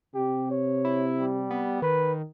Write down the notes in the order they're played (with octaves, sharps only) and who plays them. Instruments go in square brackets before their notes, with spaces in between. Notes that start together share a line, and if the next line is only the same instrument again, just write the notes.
[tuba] C3 [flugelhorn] G4
[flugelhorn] C#5
[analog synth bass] E4
[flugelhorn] G3
[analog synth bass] B3
[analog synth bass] D#3 [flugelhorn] B4